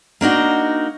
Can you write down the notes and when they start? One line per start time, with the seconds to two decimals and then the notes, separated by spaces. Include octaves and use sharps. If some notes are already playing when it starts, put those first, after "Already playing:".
0.21 A#3 D4 D#4 F#4